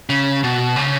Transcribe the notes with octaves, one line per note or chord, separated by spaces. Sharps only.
C#3
B2
C#3